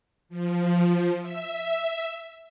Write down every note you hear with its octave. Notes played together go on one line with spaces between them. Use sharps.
F3
E5